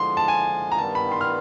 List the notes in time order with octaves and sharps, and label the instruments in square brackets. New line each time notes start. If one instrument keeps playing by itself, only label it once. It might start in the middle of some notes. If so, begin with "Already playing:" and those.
Already playing: [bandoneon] D3 F3 G#3 [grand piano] C6
[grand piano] A5
G#5
A#5
[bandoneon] G2 D#3 G3 B3 [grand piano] A5
[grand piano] B5
C6
F6